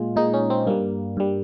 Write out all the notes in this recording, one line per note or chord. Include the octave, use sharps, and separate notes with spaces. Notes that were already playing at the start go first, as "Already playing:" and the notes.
Already playing: A#2 G#3 F4
A#2 G#3 D#4
C#4
C4
G2 G3 A#3
G2 G3